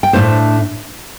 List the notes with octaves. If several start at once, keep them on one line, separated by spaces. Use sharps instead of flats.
G5
A2 A3 D4 C5 F5